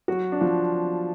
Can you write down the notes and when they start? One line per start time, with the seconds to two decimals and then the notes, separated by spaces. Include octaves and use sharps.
0.08 F#3 F#4
0.32 D4
0.41 F3 F4